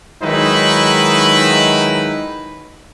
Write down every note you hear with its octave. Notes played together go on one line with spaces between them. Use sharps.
D#3 F#3 G#3 D#4 E4 B4